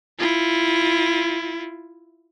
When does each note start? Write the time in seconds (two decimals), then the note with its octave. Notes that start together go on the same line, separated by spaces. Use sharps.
0.19 E4 F4